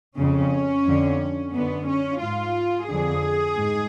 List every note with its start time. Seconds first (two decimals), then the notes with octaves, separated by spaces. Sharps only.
0.18 F2 C#3 C#4
0.86 F2 D3
1.54 F#2 D3 B3
1.87 C#4
2.21 G#2 F4
2.89 F2 D3 G#4
3.56 G#2